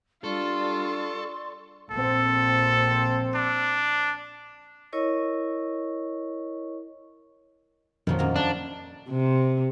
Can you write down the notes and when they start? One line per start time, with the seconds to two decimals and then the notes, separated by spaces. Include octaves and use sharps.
0.24 G3 D4 F4 A4 D5 C6 C#6
1.91 A#1 C4 A4
3.35 D4
4.93 E4 A#4 C#5 D#5 C#6
8.07 F2 A#2 D3 D#3 F3 F#3
8.19 F#2 A#3 A#5
8.36 F#2 F3 D4
9.09 C3